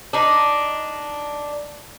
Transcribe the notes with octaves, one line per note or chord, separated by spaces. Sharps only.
D4 D#4